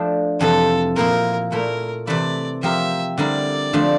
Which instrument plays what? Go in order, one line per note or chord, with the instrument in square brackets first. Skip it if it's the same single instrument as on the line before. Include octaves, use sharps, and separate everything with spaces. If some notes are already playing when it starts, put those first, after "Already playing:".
Already playing: [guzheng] F3 A3 D4
[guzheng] F2 C3 E3 [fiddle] A4
[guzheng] A#2 F3 A#3 E4 [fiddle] A#4
[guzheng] A#2 A3 E4 [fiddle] A#4
[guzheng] C3 E3 A3 E4 [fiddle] D5
[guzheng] F3 C4 G4 A#4 [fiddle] E5
[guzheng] D3 G3 C4 E4 A#4 [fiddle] D5
[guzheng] D3 F3 A3 D4 F4